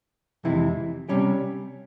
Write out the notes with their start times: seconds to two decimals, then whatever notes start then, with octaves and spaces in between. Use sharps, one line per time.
0.44 F2 C3 E3 G#3 E4
1.09 C3 G3 C#4 G4